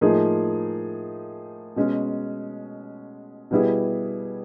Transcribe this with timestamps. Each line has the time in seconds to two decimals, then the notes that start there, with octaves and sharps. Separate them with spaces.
0.01 A2 F3 A#3 D#4 G#4
1.76 B2 G#3 C#4
3.51 B2 G3 B3 E4 G#4